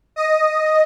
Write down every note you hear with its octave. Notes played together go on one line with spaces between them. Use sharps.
D#5